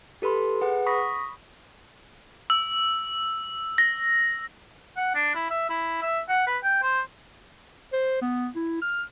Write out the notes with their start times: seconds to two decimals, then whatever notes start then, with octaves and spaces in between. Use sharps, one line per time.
0.22 G4 A4 B4 B5 C6
0.61 G#4 B4 F#5
0.86 B5 C#6 D#6 A#6 B6
2.50 E6
3.78 A#6
4.97 F#5
5.15 D4
5.35 E4
5.50 E5
5.70 E4
6.02 E5
6.29 F#5
6.47 B4
6.63 G5
6.83 C5
7.93 C5
8.22 B3
8.56 E4
8.82 F6